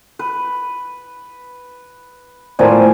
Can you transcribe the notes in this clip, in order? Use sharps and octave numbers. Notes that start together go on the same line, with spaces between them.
B4
A2 F3 C4 A#4 D5 G#5